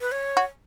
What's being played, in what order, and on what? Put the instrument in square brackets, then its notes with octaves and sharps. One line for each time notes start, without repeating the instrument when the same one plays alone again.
[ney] B4
C#5
[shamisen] F#4